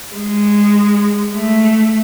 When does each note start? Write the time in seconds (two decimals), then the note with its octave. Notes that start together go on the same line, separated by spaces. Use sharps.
0.14 G#3
1.34 A3